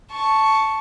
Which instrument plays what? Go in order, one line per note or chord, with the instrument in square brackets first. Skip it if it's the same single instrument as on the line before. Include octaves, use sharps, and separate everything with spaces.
[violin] A5 C#6